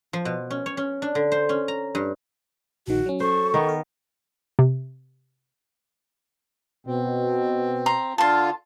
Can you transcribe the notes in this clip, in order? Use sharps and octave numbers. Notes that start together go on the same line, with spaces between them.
F3
B2
C#4
C#5
C#4
D4
D3
C5
C#4
A#5
G2
A#1 D#3 F#4
F#3 C#4
A4 C5 C#6
D#3 B3
A#4
C3
B2 C4
A#5 C6
D3 F4 A5 C6